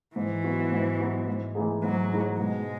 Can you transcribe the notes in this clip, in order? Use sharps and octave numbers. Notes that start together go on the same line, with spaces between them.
G#2 E3
F#3 B3 F#4
G#2
F#3 B3 F#4
G#2
E3 A3 D#4 G#4
G#2 F#3
E3 A3 D#4 G#4
B2 G#3